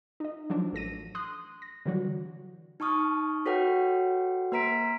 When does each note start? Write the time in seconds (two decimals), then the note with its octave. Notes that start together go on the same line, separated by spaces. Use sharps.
0.20 D#4 D#5
0.50 F3 F#3 D4
0.73 A1 A4 A#6 D#7
1.15 C6 D#6 F#6
1.62 A#6
1.86 D3 E3 F#3 G3 F#4
2.80 D#4 A5 C#6 D#6 F6
3.46 F#4 A4 B4 C#5 F#5 G5
4.52 A#3 B4 A#5 B6 D7